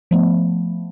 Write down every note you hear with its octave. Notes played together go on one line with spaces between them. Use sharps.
F3 A3 B3